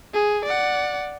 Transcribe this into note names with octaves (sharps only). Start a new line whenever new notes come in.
G#4
D5 F#5